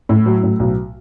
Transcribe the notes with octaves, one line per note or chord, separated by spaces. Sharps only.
A2
F#3
A2
B1